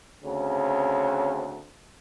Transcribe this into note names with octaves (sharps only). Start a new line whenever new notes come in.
D2 C#3 C4